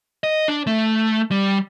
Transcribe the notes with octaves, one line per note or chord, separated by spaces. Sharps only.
D#5
D4
A3
G3